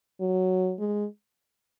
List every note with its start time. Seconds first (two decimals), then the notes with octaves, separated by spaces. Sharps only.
0.21 F#3
0.79 G#3